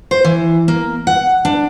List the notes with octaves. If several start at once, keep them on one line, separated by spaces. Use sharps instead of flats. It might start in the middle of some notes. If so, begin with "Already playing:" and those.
C5
E3
A#3
F#5
D4